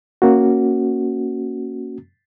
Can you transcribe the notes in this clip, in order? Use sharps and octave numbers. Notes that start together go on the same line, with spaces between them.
A#3 C#4 F#4